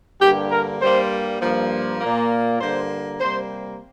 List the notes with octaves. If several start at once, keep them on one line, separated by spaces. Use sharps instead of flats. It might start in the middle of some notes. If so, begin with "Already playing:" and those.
G2 D3 A#3 G4
A#4
G2 G3 A#3 C5
G2 F3 A#3
A#2 A#3
G2 D3 A#3 C5
C3 G3 A#3 C5